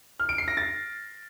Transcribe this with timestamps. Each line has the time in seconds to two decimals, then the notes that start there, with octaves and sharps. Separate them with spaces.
0.20 F6
0.29 D7
0.38 C7
0.48 A#6
0.57 A6